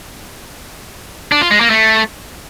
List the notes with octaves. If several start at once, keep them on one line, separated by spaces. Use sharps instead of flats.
D4
F4
G#3
A#3
A3